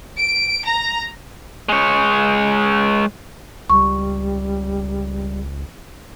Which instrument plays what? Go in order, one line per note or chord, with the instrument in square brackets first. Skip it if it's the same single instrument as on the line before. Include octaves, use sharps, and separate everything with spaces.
[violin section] D7
A#5
[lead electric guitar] G#3 C#5
[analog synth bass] C#2 [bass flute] G3 [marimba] C#6